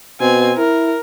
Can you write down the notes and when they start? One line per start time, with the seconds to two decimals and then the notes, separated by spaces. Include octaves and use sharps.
0.21 B2 C4 G#5
0.57 E4 A#4